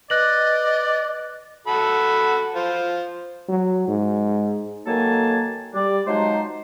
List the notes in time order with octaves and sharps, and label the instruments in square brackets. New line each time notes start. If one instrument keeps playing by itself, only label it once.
[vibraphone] B4 [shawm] D5 [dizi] D#5 [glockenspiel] F#6 A#6 F#7
[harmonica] F#4 A4 B5
F4 C5
[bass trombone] F#3
G#2
[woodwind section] D#3 F#3 A#3 A4 G#5 A5
G3 D5
F3 F#3 G#3 D#4 C5